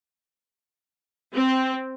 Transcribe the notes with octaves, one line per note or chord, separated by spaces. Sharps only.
C4